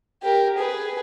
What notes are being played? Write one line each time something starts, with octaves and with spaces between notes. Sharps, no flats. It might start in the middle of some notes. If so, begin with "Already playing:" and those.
G4 A#4
G#4 B4